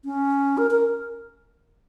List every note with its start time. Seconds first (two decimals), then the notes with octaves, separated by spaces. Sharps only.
0.05 C#4
0.58 A#4
0.71 A#4